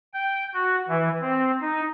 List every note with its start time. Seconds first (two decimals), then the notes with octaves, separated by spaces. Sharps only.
0.14 G5
0.54 F#4
0.88 E3
1.21 C4
1.61 D#4